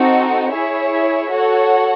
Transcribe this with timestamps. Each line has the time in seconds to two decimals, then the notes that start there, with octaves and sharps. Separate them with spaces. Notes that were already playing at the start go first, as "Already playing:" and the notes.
Already playing: C4 D#4 F#4 A4
0.52 E4 G#4 C#5 E5
1.30 F#4 A4 C#5 F#5